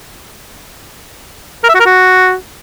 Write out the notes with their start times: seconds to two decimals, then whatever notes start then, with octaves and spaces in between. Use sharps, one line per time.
1.63 A#4
1.69 E5
1.74 F#4
1.80 A#4
1.85 F#4